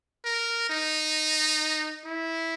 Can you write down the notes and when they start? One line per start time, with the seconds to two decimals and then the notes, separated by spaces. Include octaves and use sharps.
0.25 A#4
0.70 D#4
2.05 E4